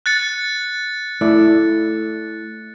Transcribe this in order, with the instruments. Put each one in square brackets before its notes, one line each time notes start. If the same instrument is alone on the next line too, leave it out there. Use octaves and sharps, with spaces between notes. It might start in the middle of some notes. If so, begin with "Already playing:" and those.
[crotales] F#6 A6 C#7
[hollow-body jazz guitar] A3 E4 D5